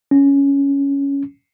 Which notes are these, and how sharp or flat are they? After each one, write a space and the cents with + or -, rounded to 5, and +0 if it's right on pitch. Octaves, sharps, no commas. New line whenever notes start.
C#4 +5